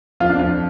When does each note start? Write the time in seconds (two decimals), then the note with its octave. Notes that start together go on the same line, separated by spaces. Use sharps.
0.20 F2 F4
0.30 D4
0.39 F2 F4